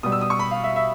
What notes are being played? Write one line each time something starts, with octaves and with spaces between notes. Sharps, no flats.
B2 G3 D#6
E6
D#6
C#6
B5
F5
E5
E5